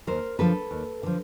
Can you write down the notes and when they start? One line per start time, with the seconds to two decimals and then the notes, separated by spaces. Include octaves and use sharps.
0.07 D#2 A#4 C5
0.39 D3 F3 A4 B4
0.71 D#2
1.03 D3 F3